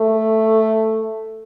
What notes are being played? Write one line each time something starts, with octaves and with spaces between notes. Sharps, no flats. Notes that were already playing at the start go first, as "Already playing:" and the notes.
Already playing: A3